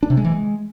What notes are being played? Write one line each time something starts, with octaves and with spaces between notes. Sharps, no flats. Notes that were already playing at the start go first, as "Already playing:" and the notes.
D4
C3
G#3
E3
G#3